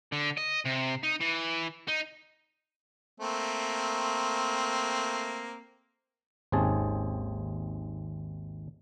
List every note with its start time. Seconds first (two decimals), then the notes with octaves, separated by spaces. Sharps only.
0.12 D3
0.37 D#5
0.65 C3
1.03 D#4
1.20 E3
1.88 D#4
3.20 A3 A#3 C4
6.52 G#1 D#2 C4 C#4 G#4 A5